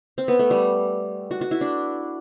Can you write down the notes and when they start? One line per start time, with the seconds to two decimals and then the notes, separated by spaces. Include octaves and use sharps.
0.18 C4
0.28 B3
0.39 A3
0.51 G3
1.31 F#4
1.41 F#4
1.51 E4
1.61 D4